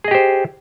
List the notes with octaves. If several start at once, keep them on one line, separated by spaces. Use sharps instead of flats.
G4 G#4 C5 D#5